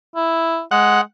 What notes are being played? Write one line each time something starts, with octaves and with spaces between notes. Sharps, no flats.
E4
G#3 F#5